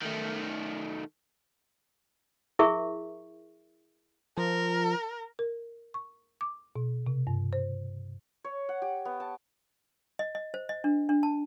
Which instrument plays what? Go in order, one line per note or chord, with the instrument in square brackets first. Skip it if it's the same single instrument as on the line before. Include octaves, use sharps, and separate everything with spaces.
[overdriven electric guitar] D#3 A3
[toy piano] E4 G#4 A#4 E5 C#6
[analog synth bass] F3 [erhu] A#4
[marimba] A#4
C#6
D6
B2
C3
G2
C5
[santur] C#5
F#5
G4
B3
A5
[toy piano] D#5
D#5
C5
D#5
D4
D4
A5